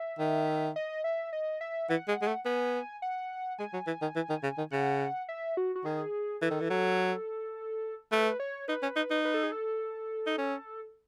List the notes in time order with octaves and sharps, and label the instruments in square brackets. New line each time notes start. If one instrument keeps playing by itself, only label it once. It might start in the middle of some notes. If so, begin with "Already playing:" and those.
Already playing: [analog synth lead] E5
[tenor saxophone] D#3
[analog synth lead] D#5
E5
D#5
E5
[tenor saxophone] E3 [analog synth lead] F#5
[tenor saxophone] G#3
G#3
A3
[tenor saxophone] B3 [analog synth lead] G#5
[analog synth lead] F#5
[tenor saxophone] G#3 [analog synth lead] G#5
[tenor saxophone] F#3
E3
D#3
E3
D#3
C#3
D#3
[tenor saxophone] C#3 [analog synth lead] F#5
[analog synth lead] E5
F#4
F#4
[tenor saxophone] D#3 [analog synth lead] G#4
[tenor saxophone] E3 [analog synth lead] A4
[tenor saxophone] D#3
E3
F#3
[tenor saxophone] A3 [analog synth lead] B4
[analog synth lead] C#5
[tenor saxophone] D#4 [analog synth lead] B4
[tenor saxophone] C#4
D#4
D#4
[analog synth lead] B4
A4
G#4
A4
[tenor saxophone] D#4
C#4